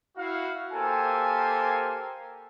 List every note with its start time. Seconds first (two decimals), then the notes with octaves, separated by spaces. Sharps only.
0.17 E4 F#4 F5
0.73 A#3 G4 A4 A#4 C5 G#5